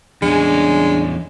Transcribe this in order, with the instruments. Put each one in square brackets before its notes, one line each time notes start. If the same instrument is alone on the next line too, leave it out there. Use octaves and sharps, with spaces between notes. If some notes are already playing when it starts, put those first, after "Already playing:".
[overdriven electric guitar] E2 C#4 [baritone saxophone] G#3 [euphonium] D4